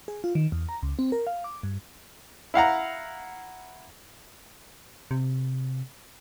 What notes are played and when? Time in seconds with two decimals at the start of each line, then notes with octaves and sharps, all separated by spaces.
0.08 G#4
0.24 F4
0.35 D#3
0.52 E2
0.69 A#5
0.83 C#2
0.99 C4
1.12 A#4
1.27 F5
1.44 D6
1.63 G2
2.54 E4 F5 F#5 A#5
5.11 C3